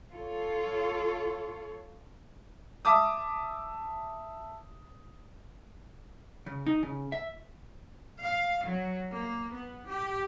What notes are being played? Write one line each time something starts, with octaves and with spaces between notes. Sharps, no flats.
F4 A4 C#5
E5 A5 D6 D#6
C#3
D#4
C#3
E5
F5
F#3
A#3
B3
G4